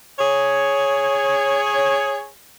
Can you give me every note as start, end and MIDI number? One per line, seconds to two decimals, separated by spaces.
0.19 2.28 68
0.19 2.28 73